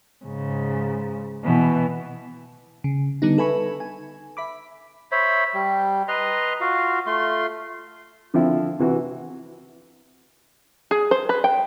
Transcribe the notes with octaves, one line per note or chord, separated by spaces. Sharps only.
G#2 C#3
B2 E3
C#3
D3 G3 B3 D#4
A4 B4 E5 G#5 B5 C#6
G#5
E5 B5 D6
C5 C#5 E5 B5
G3
B4 D#5 A#5 C6
F4 F#4 F5
A3 F4 C6
D3 F3 C4 E4
C3 E3 F#4
G#4
C5
B4
G5